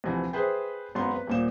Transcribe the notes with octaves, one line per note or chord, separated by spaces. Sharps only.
D2 C3 E3 F3
G#4 B4 C5 E5 G5
G#1 F#2 B3 C6
B4
D#1 A#2 E7